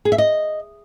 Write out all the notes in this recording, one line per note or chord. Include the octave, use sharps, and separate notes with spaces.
G#4
E5
D#5